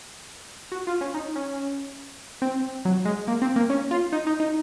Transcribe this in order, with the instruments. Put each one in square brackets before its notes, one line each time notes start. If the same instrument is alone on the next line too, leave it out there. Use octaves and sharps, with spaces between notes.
[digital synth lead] F#4
F4
C#4
D#4
C#4
C4
F#3
G#3
A#3
C4
A#3
C#4
F4
D#4
D#4
D#4